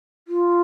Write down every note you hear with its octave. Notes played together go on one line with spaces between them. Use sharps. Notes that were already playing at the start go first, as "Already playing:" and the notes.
F4